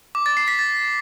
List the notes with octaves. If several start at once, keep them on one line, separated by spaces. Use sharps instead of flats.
D6
A6
C7
B6
A6